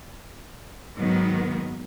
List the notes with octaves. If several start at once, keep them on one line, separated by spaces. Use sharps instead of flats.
G#2 D#3 F#3 B3